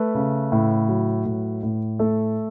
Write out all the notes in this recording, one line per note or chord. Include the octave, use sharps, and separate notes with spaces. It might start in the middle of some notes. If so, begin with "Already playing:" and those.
Already playing: A3 B4
C#3
A2
F#3
A2
A2
A3 A4